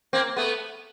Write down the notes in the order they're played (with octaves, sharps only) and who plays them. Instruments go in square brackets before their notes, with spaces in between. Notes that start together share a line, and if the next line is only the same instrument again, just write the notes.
[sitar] A#3 C4
A3 B3